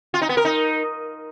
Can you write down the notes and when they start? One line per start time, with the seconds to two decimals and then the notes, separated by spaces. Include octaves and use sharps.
0.14 F4
0.22 D#4
0.29 B3
0.37 A#4
0.45 D#4